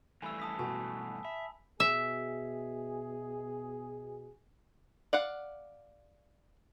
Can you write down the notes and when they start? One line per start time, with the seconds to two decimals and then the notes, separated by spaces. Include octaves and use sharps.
0.22 G2 E3 A3 G#5 B5 E6
0.40 A5 D#6 B6
0.59 B2 G#5 A5 B5
1.25 E5 B5
1.80 B2 G#4 E5
5.13 D5 F5 F#5